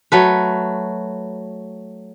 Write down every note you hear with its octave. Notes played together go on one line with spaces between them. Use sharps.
F#3 A3 B4